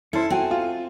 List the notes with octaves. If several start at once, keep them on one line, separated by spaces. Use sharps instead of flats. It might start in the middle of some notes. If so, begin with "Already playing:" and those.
C#4 E4 A4 C5 A5
C4 F#4 G5 G#5
F4